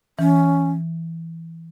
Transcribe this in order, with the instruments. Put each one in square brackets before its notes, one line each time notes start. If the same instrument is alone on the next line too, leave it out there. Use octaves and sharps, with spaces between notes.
[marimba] E3 [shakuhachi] C#4